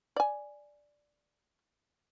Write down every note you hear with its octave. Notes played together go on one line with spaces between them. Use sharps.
D5 G#5